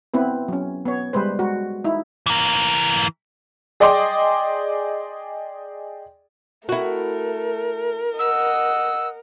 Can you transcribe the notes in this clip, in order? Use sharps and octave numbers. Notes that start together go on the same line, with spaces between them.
B3 C4 E4 B4
F#3 C#4
B3 C#5
G3 G#3 B4 C5
G#3 F#4
D#4 E4
E3 A#4
G#4 D5 D#5 G5 C6 D6
A3 E4 F#4 A#4
D#5 F#5 E6